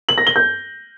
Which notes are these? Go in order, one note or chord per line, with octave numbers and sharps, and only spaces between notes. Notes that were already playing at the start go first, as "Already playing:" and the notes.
F#7
A#6
G7
G6